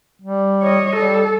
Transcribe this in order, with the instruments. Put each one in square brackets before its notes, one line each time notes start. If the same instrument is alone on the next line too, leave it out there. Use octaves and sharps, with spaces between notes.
[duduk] G3
[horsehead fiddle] C#5 D#5
[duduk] G3 [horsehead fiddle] A4